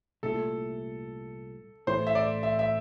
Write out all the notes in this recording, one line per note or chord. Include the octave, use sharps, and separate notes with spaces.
C2 A#2 A3 E4 A4
A2 E3 A3 E4 C5
E5
D5
E5
E5